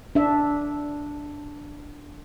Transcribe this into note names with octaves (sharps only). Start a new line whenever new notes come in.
D4 E5